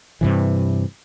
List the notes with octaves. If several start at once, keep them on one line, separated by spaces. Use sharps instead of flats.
G2 C3 E3